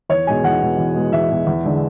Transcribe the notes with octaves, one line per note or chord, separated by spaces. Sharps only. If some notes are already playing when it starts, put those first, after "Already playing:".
E2 C#5
B2 G#3 G#5
E2 F#5
B2 G#3
E2
B2 G#3
E2 E5
B2 G#3
E2
D3 G#3